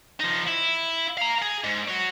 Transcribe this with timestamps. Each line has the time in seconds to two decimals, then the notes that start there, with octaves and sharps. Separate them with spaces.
0.20 F3 D#4
0.48 E4
1.18 F5 A#5
1.42 G#4
1.64 G#2
1.88 F#4 C#5